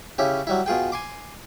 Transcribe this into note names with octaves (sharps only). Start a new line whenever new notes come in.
C#3 C#4 E4 G4
F#3 G3 E4
B2 F4 G#4 G5
G#5 C6 D6